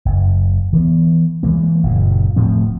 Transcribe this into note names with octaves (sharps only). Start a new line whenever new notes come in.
F#1
E3 B3
E3 G#3 A#3
F#1 A#2 C#3
D1 A2 F3 C4